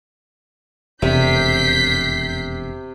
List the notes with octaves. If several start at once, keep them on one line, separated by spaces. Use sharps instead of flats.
E1 F2 C3 G6 B6 C7